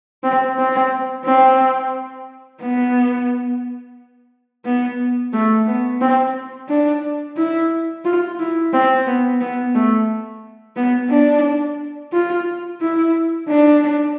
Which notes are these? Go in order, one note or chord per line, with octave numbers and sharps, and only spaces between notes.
C4
C4
C4
B3
B3
A3
B3
C4
D4
E4
F4
E4
C4
B3
B3
A3
B3
D4
F4
E4
D4